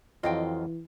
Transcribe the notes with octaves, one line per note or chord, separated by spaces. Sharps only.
F2 E3 F#3 F4 D#5 F5 G5